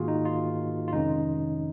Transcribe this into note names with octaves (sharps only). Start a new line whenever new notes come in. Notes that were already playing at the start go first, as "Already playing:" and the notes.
Already playing: G#2 D#3 A#3 F4 F#4 G#4
D#4
F4
F4
F2 C3 D#3 G#3 C#4 D#4